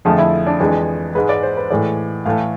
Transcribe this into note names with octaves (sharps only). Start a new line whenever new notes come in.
F2 D3 F3 A3 G#4
E4
D4
F2 E3 G#3 D4
G#2 G#3 B4
D5
C5
B4
A2 E3 G#3 D5
A2 E3 A3 F5